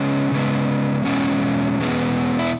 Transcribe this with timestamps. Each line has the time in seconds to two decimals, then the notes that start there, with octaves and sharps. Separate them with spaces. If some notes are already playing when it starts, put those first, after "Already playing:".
Already playing: C#3 G#3 B3 C#4
0.32 C#3 G#3 B3
1.05 E2 B2 G#3 C#4
1.78 E2 B2 G#3 B3
2.39 E4